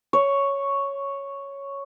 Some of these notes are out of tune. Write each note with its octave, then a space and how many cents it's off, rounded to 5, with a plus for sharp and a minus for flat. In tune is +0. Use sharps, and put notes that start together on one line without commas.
C#5 +0